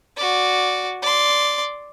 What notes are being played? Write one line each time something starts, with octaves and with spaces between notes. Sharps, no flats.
F#4 D5
D5 C6